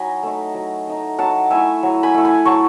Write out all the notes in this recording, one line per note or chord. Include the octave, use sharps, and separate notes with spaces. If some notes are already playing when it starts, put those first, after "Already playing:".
Already playing: F#3 D#4 D#5 F#5 G#5 B5
A3 D#4
F#3
A3 D#4
F#3 F#5 A5
A3 E4 E5 G#5
F#3
G#5 B5
A3 E4
G#5 B5
F#3 A5 C#6